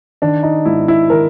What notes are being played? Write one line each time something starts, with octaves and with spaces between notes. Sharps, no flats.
D#3 D4
D#4
G#2 E4
E4
D#3 A#4